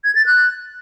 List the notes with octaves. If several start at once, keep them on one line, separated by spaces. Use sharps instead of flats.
G#6
A6
F#6